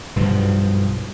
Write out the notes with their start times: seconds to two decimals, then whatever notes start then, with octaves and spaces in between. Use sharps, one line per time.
0.16 B1 G2 B2 F3